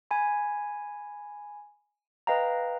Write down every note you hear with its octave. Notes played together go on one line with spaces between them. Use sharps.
G#5 B5
B4 D#5 F5 G5 A#5